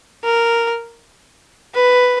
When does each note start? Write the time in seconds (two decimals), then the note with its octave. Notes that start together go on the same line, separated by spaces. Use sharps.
0.24 A#4
1.74 B4